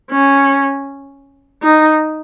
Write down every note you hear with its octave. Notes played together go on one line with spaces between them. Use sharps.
C#4
D#4